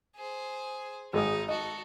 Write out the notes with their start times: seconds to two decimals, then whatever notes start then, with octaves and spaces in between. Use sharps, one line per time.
0.16 G#4 C5
1.13 G#1 G#3 D#4 D#6
1.49 F#4 A4 D#5